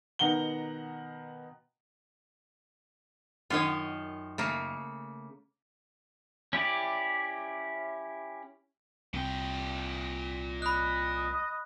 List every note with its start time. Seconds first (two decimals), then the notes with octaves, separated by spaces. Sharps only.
0.19 B2 D#3 F#5 A#5 G7
3.50 F#2 D#3 F4 C#5 D#5
4.38 C#3 A3 A#3
6.53 C#4 E4 G4 D5
9.13 C2 A#2 G5
10.62 D#5 B5 F#6